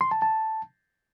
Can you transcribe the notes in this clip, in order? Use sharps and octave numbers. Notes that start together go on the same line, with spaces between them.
C6
A5
A5